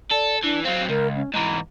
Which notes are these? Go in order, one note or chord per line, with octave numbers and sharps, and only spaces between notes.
A4 D5
E3 D4
F#3 C4 F5
C#2 A#4
C#4
G#2 E3 A#5